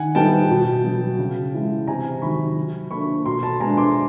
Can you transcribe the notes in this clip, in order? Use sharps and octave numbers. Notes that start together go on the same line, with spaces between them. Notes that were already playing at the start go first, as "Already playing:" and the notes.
Already playing: D#3 F#5 G#5
G3 B3 D#4 G5 A5
B2
F#3 B3
C#3
E3 G#3
C3 G#5 A#5
D#3 F#3 B5 C#6
F#3
A#3 D4 B5 C#6
B2 A#5 C6
A5 B5
G#3 B3 D4 G#5 A#5
C6 D6